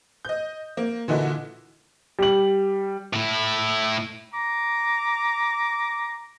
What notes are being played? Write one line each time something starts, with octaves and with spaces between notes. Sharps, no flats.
D#5 G6
A#3
A#2 D3 E3 D#4 E4 F#4
G3 F#7
A2 E4
A#5 D6